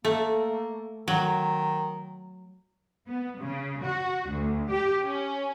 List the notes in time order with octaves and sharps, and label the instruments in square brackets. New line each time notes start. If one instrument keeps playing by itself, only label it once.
[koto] A3 [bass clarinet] A#3
[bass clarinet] D#3 [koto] F#3
[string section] B3
C#3
F#4
D2
G4
C#4